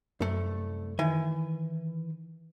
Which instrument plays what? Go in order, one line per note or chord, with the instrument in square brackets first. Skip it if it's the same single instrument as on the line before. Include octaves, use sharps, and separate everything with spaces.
[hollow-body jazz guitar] C2 A3 [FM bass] F#2
[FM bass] D#3 [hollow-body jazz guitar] E3 G#5